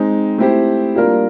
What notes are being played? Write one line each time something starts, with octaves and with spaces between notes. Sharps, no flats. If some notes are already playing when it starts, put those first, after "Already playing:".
Already playing: G#3 C4 D#4
A3 C4 E4 G4 C5
G3 A#3 D4 F4 A#4